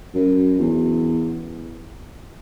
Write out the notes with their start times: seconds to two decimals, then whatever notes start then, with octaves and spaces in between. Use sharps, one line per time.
0.15 F#2
0.59 E2